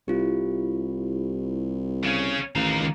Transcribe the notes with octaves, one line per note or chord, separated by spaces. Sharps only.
C2 E4 F4 G4
C#3 C#4
A1 D#3 F5 A#5
C#2